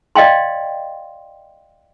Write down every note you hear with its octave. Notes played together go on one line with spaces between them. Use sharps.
D5 D#5 F5 G5 C6